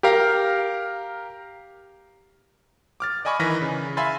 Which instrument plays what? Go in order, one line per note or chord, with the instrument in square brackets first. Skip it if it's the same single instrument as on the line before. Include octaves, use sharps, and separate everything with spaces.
[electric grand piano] G4 A#4 F5 A#5
D6 F6 A6
D5 D#5 G#5 B5 C#6
D#3 E3 A#4 B4 A#6 B6
C#3
E5 F5 G#5 B5 C6 A6